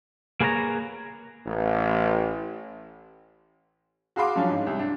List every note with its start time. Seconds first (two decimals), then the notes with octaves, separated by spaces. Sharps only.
0.41 A#3 G#4 B4 C#5 A5 A#5
1.47 A1
4.16 F#4 G#4 F5 B5 C6 D6
4.36 F3 F#3 C#4 D4 F4
4.49 G#2
4.67 C2
4.79 D4